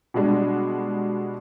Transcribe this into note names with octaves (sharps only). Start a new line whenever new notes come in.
B2 G3 G#3 D4